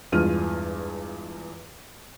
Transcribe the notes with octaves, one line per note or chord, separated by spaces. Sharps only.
E2 G2 G#3 F4 F6 D#7